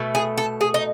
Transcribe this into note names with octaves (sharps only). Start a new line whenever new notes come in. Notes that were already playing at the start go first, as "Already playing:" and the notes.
Already playing: B2 A3
G#4
A4
G#4
D#4